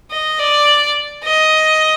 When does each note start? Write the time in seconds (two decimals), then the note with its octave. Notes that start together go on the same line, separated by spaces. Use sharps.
0.10 D#5
0.39 D5
1.24 D#5